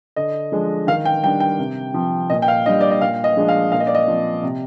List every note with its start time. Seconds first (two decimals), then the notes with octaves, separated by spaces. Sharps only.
0.16 D3 D#5
0.52 F3 G#3 D4
0.87 D#3 F5
1.05 G5
1.23 G3 D4 G5
1.40 G5
1.59 C3
1.94 F3 C4
2.30 A#2 D#5
2.42 G5
2.48 F5
2.66 D4 D#5
2.68 G3
2.81 D5
2.91 D#5
3.01 A#2 F5
3.24 D#5
3.37 F3 G#3 D4
3.48 F5
3.72 A#2 F5
3.80 D#5
3.87 D5
3.95 D#5
4.08 F3 C4
4.43 C3